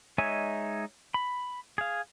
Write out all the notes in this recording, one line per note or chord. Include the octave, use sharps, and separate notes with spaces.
G#3 D#4 C#5 E5 G#5
B5
G#4 F5